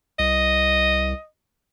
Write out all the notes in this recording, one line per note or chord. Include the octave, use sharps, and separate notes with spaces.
C2 D#5